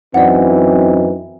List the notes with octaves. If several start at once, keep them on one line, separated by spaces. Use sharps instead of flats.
F#2 E3 C4 D#4 D5 F#5